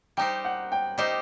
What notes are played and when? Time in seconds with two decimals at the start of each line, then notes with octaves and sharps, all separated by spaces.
0.17 G3 D#4 G4 C5 G5
0.45 F#5
0.72 G5
0.98 G3 D#4 G4 C5 D#5